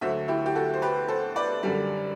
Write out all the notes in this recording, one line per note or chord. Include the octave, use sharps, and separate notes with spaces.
D2 D3 F#3 C5 E5
E4 G4
G4
F#4 A4
C5
G4 B4
A4 C5
B4 D5
F#2 D3 G3